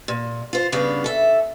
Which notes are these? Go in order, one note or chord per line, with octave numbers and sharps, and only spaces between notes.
A#2
F4 C5
G2 C#3 B3 D4 G#4 F5
A4 E5